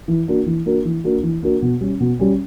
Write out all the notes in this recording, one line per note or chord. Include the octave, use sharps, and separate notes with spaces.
E3
A#3 D4 F#4 A#4
E3
A#3 D4 F#4 A#4
E3
A#3 D4 F#4 A#4
E3
A#3 D4 F#4 A#4
B2
G3 C#4
B2
G3 C#4